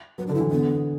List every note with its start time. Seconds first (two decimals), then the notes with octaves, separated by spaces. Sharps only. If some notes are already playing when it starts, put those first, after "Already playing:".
0.18 F#3 B4
0.27 D3 D4
0.34 E4
0.40 E3
0.51 D3 B3